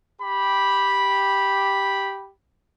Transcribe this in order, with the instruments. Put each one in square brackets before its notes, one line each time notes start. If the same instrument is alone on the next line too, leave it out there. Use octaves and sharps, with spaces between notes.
[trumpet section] G4 B5